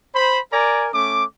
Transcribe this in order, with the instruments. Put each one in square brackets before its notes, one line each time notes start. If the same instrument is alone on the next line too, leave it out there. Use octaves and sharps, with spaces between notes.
[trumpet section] C5 B5
A#4 D5 G#5 A#5
A3 C#4 D6